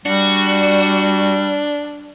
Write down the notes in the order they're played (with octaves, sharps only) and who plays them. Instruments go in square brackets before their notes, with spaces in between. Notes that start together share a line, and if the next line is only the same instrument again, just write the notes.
[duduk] G3 [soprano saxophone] D4 [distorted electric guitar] F#4